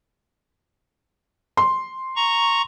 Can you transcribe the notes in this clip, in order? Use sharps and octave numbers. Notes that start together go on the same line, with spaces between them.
C6
A#5 C#6